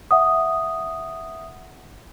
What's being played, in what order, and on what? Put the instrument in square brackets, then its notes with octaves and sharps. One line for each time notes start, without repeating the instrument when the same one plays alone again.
[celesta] E5 F#5 D#6